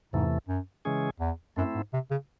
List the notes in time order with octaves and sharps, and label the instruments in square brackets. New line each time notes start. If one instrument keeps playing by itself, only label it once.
[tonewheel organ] E2 C3 E3 A3 [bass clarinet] G#2
[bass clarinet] F#2
[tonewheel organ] C#3 E3 G#3 C#4 G#4
[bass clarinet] E2
[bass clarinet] F#2 [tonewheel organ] A3 C4 E4
[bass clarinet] G#2
C3
C#3